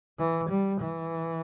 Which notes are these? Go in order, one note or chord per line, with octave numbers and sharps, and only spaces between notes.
E3
G3
E3